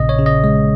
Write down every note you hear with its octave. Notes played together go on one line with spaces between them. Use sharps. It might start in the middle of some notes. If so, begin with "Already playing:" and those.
Already playing: A#1 A#2 C#3 D#5
C#5
C#3
D#5
G#3